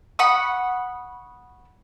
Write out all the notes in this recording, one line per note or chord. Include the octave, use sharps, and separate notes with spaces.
F#5 B5 C#6 D#6